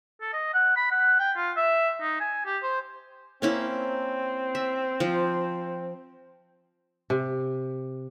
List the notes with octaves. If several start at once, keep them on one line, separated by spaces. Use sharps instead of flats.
A4
D#5
F#5
B5
F#5
G5
F4
E5
D#4
G#5
G4
C5
A#3 C4 C#4 E4
E5
F3
C3